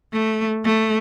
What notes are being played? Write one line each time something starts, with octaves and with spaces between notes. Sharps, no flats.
A3
A3